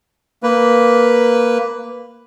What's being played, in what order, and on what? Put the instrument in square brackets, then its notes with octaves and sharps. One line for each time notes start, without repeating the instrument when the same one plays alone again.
[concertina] A#3 B4